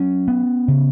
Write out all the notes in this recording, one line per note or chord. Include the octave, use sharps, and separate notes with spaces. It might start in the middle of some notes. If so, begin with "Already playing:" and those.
Already playing: F#3 C#4
B3
C#3